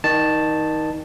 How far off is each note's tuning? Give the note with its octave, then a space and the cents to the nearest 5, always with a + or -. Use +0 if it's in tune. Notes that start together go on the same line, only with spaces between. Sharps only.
D#3 +20 D#5 -40 A5 +0